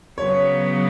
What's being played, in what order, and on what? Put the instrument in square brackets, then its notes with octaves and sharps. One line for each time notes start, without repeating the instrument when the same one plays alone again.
[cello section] C#3 F#3 B3 [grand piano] C#5